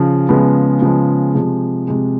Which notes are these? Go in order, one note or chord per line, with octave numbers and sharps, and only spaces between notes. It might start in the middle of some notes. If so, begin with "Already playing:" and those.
Already playing: C#3 F3
C#3 F3 G#3 B3
C#3 F3 G#3 B3
C3 F3 G#3
C3 F3 G#3